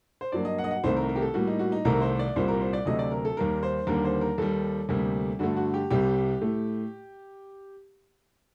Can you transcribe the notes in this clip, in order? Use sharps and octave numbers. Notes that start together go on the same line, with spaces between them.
C5
G2 F#3 A#3 D5
D#5
F#5
D#5
F#5
C2 C3 D#3 A3 C5
A#4
A#4
G4
A4
A2 G3 A#3 F#4
D#4
F#4
D#4
C2 C3 D#3 A3 A#4
C5
D5
C2 A#2 G3 A#3 C5
A#4
C5
D5
D2 C3 F#3 A3 D#5
D5
A#4
A4
D#2 D#3 G3 A#3 A#4
C5
D#2 D3 G3 A#3 A#4
C5
A#4
D#2 D#3 G3 A4
D2 C3 G3 A#3
G2 D3 A3 F#4
F#4
G4
C2 C3 G3 G4
A2 A3